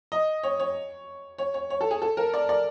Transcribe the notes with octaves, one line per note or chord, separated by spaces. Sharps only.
D#5
C#5
C#5
C#5
C#5
C#5
A4
G#4
A4
A#4
D5
D5